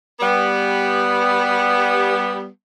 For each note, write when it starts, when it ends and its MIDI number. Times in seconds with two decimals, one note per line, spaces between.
0.20 2.47 55
0.20 2.47 59